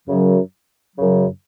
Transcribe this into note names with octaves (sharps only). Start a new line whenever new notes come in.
F#2 C#3 F#3
F#2 C#3 F#3